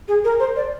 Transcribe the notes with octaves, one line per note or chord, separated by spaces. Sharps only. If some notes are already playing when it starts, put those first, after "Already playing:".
G#4
A#4
C5
D5